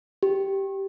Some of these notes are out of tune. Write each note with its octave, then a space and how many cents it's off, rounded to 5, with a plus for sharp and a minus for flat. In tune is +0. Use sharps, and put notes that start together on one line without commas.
G4 -5